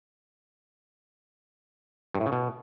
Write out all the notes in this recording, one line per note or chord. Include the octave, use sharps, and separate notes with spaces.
G2
A2
C#3
B2